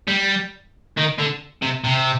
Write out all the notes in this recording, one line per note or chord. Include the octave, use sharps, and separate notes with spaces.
G3
D#3
D3
C3
C3